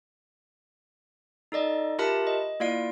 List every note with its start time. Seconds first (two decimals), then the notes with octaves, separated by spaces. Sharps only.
1.52 D#4 A4 D5 D#5
1.99 F4 G4 A#4 E5 A5 B5
2.27 D#5
2.60 A#3 E4 F4 D5 F5 D7